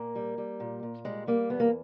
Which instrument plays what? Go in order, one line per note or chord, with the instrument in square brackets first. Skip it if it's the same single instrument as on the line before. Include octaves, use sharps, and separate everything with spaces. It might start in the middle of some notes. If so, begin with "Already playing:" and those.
Already playing: [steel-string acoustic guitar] A#2 A#3
G3
G3
A#2
A#2
G3 G#3
G3 A#3
E2 B3
A#3